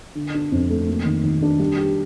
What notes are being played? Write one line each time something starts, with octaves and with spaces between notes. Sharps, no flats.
D3
D4
F2
A3
A#3
D#3
D#3
D4
G3
G4